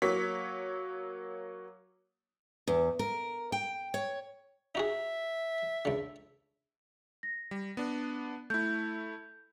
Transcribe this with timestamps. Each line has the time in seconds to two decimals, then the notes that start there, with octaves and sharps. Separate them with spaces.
0.02 F#3 A#3 C#5 B6
2.67 E2
2.99 A#4
3.52 G5
3.94 C#5
4.75 D#4 F#4 G#4 E5
5.85 C#2 D3
7.23 A#6
7.51 G3
7.77 B3 D4
8.50 A3 E4 G6